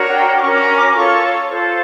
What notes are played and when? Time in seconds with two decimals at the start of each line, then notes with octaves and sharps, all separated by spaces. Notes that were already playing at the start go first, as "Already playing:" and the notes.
Already playing: D4 F#4 A#4 C#5
0.09 F#5
0.15 G5
0.35 D6
0.42 C#4 F#4 A#4 C#6
0.53 D6
0.59 C#6
0.77 D6
0.89 D6
0.95 F4 A4 C#5 C#6
1.48 F4 A4 C5